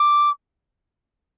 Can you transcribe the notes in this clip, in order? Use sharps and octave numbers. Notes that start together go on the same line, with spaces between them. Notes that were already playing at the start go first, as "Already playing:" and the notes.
Already playing: D6